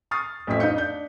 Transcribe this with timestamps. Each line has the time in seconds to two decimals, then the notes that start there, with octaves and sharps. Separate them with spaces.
0.11 C#6 D#6 F6 A6 C7
0.47 A1 F2 A3 E5 B6
0.60 D#4 D#5 F5 G6 C#7
0.77 D4 G6